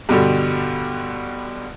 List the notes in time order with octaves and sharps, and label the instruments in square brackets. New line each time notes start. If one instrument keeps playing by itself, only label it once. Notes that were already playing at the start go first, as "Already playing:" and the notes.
[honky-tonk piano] G2 B2 D3 G3